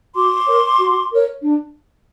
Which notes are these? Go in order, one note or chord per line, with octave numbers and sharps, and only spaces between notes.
F#4 C6 D6
A#4 C#5
F#4
A#4 C#5
D4